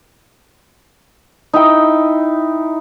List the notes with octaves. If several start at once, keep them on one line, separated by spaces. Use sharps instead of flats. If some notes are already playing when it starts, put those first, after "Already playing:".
D#4 E4 G5